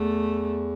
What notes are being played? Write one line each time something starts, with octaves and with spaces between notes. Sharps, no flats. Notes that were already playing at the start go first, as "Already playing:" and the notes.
Already playing: E2 A3